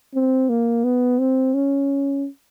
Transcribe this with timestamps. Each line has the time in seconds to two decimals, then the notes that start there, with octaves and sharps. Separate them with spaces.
0.15 C4
0.49 A#3
0.84 B3
1.19 C4
1.54 C#4